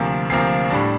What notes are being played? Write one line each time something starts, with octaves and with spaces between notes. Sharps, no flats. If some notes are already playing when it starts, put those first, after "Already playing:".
Already playing: D2 C3 F3 A#3
D2 C3 F3 A#3 C7
A2 G3 D4